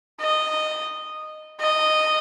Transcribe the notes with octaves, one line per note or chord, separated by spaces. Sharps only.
D#5
D#5